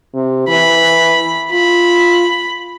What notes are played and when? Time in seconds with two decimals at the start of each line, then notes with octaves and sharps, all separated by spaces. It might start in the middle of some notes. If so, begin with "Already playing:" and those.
0.14 C3
0.48 E3 B5
1.52 F4 B5